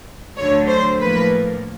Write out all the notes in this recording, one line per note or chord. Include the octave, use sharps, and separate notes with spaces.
D2 D3 F#3 A3 C#5
C5
A2 F3 A#3 B4